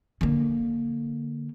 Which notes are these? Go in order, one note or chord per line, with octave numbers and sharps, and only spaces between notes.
D3 A#3